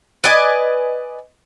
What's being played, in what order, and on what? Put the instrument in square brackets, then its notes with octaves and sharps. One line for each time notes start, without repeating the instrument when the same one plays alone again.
[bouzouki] B4 D5 D#5 G#5